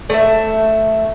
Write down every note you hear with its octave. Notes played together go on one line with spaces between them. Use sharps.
A3 E5